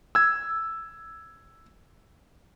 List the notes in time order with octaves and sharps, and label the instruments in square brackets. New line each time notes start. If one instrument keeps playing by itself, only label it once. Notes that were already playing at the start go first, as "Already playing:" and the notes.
[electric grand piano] E6 G#6